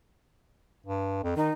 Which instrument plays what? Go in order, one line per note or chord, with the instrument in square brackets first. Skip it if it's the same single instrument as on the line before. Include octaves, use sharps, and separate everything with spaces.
[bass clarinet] G2
F2
[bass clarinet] D#3 [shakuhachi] D#4